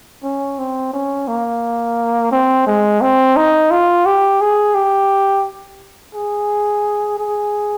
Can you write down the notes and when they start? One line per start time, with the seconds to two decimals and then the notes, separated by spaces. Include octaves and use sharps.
0.23 C#4
0.58 C4
0.93 C#4
1.28 A#3
2.31 C4
2.67 G#3
3.01 C4
3.36 D#4
3.71 F4
4.06 G4
4.41 G#4
4.75 G4
6.15 G#4
7.18 G#4